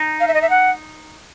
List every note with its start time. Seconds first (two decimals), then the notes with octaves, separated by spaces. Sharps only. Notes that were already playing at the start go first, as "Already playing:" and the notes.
Already playing: D#4
0.20 F5
0.28 E5
0.34 D#5
0.42 E5
0.50 F#5